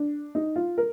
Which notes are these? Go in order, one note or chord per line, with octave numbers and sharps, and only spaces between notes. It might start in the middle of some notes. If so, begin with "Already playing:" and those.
Already playing: D4
D#4
F4
A#4